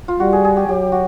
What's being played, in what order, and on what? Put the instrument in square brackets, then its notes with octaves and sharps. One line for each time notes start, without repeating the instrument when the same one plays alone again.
[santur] F4
[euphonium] G3 [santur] F#4
[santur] G#4
G#4
G4
[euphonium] F#3 [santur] G4
[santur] F#4